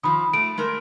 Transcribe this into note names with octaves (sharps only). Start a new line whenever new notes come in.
D#3 F3 B5 D#6
A3 D7
G#3 A3 A#4